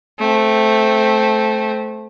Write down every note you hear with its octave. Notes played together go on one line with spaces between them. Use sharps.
A3 C4